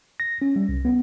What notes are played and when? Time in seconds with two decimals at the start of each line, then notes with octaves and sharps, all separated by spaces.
0.20 A#6
0.42 C#4
0.56 G3
0.69 C2
0.85 B3